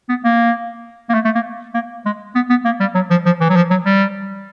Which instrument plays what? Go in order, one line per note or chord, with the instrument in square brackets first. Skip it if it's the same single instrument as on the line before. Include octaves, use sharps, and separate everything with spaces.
[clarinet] B3
A#3
A#3
A3
A3
A#3
A#3
G#3
B3
B3
A#3
G3
F#3
F3
F3
E3
F#3
F3
F#3
G3